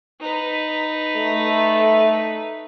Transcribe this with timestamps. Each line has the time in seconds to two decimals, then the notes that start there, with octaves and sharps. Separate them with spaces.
0.20 D#4 B4
1.16 A3